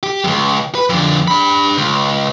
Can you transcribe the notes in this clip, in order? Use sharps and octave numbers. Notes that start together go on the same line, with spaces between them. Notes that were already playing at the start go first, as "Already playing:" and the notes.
G4
C#2 F#2
B4
F2 D3
D4 B5
C#2